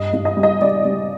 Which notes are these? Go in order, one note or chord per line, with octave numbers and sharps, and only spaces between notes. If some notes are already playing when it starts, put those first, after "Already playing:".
Already playing: G2 D#5
G2
D#5
G3
D#5
G3 D5
G3